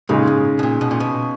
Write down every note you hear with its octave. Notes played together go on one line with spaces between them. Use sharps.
A#2 C#3 G#3 D#4
G#2
B2
A#2
B2
A#2
B2